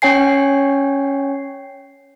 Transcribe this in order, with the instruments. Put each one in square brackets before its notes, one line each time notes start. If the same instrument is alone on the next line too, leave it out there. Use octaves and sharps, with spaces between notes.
[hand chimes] C#4 C#5 G5 G#5 C7